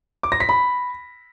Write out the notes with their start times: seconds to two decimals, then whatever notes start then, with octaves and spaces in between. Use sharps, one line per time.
0.23 D6
0.32 A#6
0.40 B6
0.49 B5